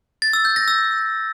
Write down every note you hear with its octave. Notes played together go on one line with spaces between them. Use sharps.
A6
E6
G6
A#6
E6